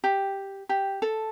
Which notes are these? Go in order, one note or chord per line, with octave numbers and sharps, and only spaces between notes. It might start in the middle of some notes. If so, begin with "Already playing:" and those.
G4
G4
A4